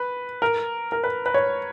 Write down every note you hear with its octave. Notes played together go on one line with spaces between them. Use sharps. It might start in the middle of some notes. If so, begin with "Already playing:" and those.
Already playing: B4
A#4
A#4
B4
B4
C#5